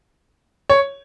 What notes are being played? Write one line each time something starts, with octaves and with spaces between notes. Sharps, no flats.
C#5